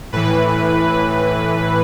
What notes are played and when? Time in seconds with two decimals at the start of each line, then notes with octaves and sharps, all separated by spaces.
0.12 A2 E3 B4